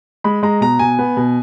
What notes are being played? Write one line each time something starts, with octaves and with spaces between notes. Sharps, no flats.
G#3 B5
G#3 A#5
B2 A#5
B2 G#5
B3
B2